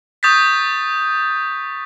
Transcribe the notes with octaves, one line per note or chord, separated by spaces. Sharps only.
C#6 D#6 G6 A6 B6